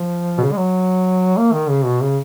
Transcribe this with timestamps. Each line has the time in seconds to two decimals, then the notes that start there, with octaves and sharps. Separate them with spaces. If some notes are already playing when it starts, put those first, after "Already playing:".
Already playing: F3
0.37 B2
0.41 C#3
0.52 G#3
0.58 F#3
1.37 A#3
1.53 D#3
1.69 C#3
1.85 B2
2.01 C#3